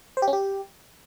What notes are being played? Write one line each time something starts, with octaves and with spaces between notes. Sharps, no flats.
C5
G4
C#4
G4